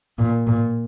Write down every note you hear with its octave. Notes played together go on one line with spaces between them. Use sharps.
A#2
A#2